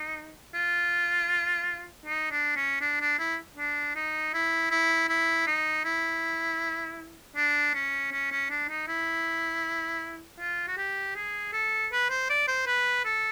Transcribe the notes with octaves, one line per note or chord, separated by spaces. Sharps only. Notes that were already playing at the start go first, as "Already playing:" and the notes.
Already playing: D#4
F4
D#4
D4
C#4
D4
D4
E4
D4
D#4
E4
E4
E4
D#4
E4
D4
C#4
C#4
C#4
D4
D#4
E4
F4
F#4
G4
G#4
A4
B4
C5
D5
C5
B4
A4